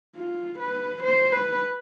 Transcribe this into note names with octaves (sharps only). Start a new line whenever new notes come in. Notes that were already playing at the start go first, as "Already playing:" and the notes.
F4
B4
C5
B4